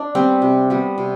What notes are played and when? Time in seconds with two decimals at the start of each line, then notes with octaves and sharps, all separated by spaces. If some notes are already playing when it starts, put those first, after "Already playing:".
Already playing: D4
0.15 G3 B3 C4
0.42 C3
0.70 G3 B3
0.98 C3